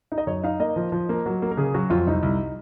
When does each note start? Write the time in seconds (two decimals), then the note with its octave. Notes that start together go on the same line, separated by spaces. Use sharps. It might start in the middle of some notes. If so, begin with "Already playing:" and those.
0.12 D#4
0.18 D#5
0.27 F#2 C#5
0.44 D#4 F5
0.60 A#3 D#5
0.76 F3
0.92 F3
1.09 A#3
1.26 F#3
1.42 A#3
1.51 A#4
1.57 C#3 G#4
1.74 F#3 F#4
1.90 F2 F4
2.06 C2 D#4
2.23 C2